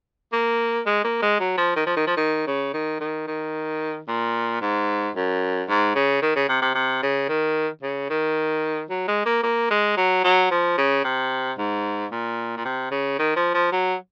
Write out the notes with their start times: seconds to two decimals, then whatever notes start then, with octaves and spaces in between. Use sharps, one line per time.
0.33 A#3
0.86 G#3
1.04 A#3
1.22 G#3
1.40 F#3
1.58 F3
1.76 D#3
1.86 F3
1.96 D#3
2.07 F3
2.17 D#3
2.47 C#3
2.74 D#3
3.01 D#3
3.27 D#3
4.08 A#2
4.61 G#2
5.15 F#2
5.69 G#2
5.95 C#3
6.22 D#3
6.36 C#3
6.49 C3
6.62 C3
6.75 C3
7.03 C#3
7.29 D#3
7.82 C#3
8.10 D#3
8.90 F#3
9.08 G#3
9.26 A#3
9.43 A#3
9.70 G#3
9.97 F#3
10.24 F#3
10.51 F3
10.77 C#3
11.04 C3
11.58 G#2
12.11 A#2
12.57 A#2
12.65 C3
12.91 C#3
13.19 D#3
13.36 F3
13.54 F3
13.72 F#3